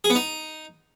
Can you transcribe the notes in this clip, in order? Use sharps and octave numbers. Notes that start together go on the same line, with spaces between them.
G#4
B3
D#4